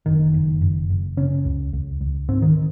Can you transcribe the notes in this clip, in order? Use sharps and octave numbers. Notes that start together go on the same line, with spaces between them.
F#1 D#3
F#1
F#1
F#1
C#3 C#4
C#2
C#2
C#2
G#2 C4
D#3